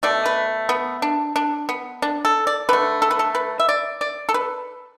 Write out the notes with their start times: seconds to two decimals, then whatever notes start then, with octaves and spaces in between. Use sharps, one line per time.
0.03 B2 A3 D5
0.26 B4
0.69 B3
1.02 D4
1.36 D4
1.69 B3
2.02 D4
2.25 A4
2.47 D5
2.69 D3 A3 B4
3.02 A4
3.11 B4
3.19 A4
3.35 B4
3.60 E5
3.69 D5
4.01 D5
4.29 A4
4.34 B4